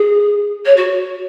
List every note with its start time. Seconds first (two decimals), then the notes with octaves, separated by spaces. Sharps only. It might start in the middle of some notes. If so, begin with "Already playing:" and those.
Already playing: G#4
0.65 C#5
0.76 F#4